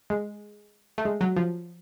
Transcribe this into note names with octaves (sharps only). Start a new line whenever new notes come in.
G#3
A3
G#3
F#3
F3